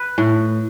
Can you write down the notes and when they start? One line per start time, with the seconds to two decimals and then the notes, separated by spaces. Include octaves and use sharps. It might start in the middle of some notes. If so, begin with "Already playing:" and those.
Already playing: B4
0.18 A2